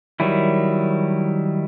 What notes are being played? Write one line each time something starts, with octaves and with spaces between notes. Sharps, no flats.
D#3 F#3 G3 E4